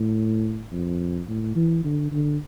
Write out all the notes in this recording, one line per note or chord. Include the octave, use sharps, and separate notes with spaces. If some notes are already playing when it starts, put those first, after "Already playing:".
Already playing: A2
F2
A2
E3
D3
D3